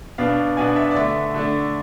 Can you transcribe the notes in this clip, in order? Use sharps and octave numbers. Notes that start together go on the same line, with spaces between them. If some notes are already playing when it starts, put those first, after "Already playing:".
B2 B3 D4 F5
B2 B3 D4 G#5
E5
D5
D3 A3 D4 E5
D3 A3 D4